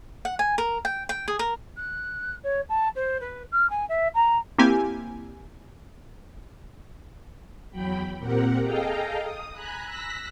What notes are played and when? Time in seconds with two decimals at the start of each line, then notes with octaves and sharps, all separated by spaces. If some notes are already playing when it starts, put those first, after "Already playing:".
0.25 F#5
0.39 G#5
0.58 A#4
0.85 G5
1.09 G5
1.28 G#4
1.39 A#4
1.77 F#6
2.43 C#5
2.69 A5
2.95 C5
3.20 B4
3.52 F6
3.69 G#5
3.89 E5
4.14 A#5
4.58 A#3 C4 E4 G4 G#5
7.71 E2 F#3 G5 B5
8.19 A#2 C4 G4 A#4 F#5
8.61 G#4 A4 D#5 F5 G5 A#5
9.22 D#6
9.52 G#5 A#5 B5 F#6
9.84 E6 F#6 A#6 B6